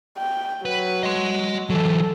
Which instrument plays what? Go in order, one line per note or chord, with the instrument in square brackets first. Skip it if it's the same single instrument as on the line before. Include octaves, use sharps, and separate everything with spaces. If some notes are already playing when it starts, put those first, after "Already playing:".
[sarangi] G5
[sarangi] F#3 [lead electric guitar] B4
[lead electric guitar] D#5 C6
[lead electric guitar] E3 F#3 [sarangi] A4